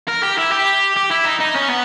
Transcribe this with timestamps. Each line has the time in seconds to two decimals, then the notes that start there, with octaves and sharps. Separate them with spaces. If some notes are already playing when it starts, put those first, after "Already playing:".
0.08 A#4
0.23 G4
0.38 E4
0.52 G4
0.97 G4
1.11 E4
1.25 D#4
1.40 D#4
1.55 C#4
1.70 B3